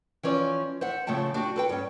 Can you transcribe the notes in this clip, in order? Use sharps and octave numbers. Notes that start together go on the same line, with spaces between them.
E3 F3 C#4 D5
C5 E5 F#5
C#3 F3 A3 G5 A5
D4 F#4 G4
A4 B4 G5
G2 C#4